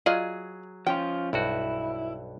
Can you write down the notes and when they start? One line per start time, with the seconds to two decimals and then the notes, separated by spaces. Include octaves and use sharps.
0.06 F#3 F4 G#4 D5 D#5
0.87 F3 C#4 F4 G5
1.33 B1 G2 E4 F#4